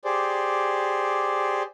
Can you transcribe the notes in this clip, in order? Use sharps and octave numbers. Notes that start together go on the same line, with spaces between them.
G4 G#4 C5 D5